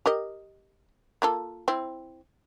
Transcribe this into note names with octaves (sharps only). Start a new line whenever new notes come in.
G4 A#4 D#5
A#3 F4 A4
C4 E4